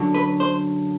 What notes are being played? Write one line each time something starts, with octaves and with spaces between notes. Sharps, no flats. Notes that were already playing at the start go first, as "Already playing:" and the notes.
Already playing: F#2 D3 F#3
B4
C5